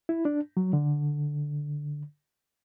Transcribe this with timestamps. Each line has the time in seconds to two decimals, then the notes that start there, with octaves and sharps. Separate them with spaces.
0.09 E4
0.25 D4
0.57 F#3
0.73 D3